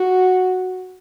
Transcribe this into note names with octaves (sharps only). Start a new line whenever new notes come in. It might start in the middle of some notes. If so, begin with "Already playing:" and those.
Already playing: F#4